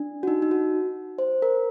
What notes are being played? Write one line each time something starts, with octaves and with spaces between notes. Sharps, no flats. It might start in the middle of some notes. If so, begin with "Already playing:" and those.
Already playing: D4
F#4
D#4
D#4
F#4
C5
A#4